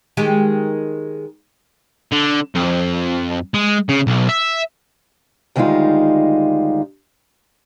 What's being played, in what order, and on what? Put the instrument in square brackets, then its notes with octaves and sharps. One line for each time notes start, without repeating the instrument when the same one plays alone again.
[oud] D#3 G#3 G4
[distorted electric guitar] D3
F2
G#3
C#3
B1
E5
[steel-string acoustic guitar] D2 D#3 G3 G#3 D#4 F4